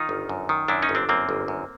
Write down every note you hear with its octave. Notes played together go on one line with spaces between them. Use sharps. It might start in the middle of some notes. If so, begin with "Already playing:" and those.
Already playing: D#3 D#4 F4
G1
F#2
D#3
F#2 D4 E4
C#4 D#4
G1
C4 D4
F#2 A#3 C4
G1
F#2